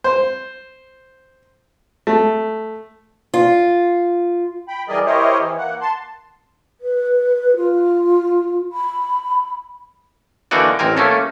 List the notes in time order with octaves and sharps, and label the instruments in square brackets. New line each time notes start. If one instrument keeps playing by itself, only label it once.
[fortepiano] C5
A3
[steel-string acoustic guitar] F4
[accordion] G5 B5
E3 G3 G#4 A#4 D5 D#5
E4 G4 A#4 C5 C#5 D#5
E3
A#3 F#5
A5 C6
[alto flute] B4
F4
B5
[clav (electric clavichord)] D3 E3 A#3 D#4 F#4 D5
A1 C4 A#4 G#5
A3 A#3 C#4 A4